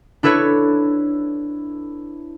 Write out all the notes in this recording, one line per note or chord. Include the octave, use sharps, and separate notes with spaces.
D4 E4 A4 B4 C#5